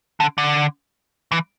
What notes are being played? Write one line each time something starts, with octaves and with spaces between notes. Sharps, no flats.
D3
D3
E3